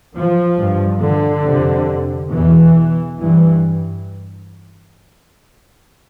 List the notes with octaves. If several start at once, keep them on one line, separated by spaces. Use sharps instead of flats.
F3
G2
D3
F2 C3
E2 B2 E3
G2 E3